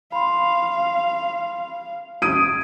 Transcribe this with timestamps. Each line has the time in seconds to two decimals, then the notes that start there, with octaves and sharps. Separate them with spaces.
0.12 F5 B5 C6
2.22 D#6 G#6 D7 D#7